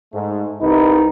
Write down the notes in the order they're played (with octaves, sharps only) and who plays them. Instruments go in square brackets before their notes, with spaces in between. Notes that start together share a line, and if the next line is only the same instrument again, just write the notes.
[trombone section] G#2 A3
[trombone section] C2 B4 [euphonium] D#4